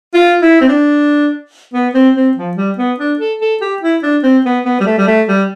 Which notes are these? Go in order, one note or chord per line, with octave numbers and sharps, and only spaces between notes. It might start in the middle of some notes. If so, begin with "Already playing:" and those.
F4
E4
C4
D4
B3
C4
C4
F3
G3
B3
D4
A4
A4
G4
E4
D4
C4
B3
B3
G3
A3
G3
A3
G3